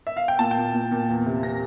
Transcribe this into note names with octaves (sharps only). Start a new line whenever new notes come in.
E5
F5
G5
A#2 A5
G5
A#2
A#2
A#2
E2
C3
C3 A#6